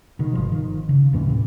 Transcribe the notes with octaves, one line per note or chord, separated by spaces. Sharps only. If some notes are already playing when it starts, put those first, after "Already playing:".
B2 D#3
G1 F3
D#3
C#3
D#2 G#2 E3 C#4
A2 C3